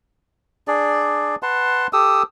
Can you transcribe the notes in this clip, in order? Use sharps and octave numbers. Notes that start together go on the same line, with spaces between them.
D4 G#4 D5
B4 F#5 A5 C6
G4 A4 D#6 E6